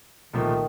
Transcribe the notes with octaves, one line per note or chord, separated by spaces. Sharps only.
C2 A#2 D#3 F3 A3